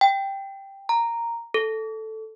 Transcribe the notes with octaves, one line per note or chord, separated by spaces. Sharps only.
G5
A#5
A4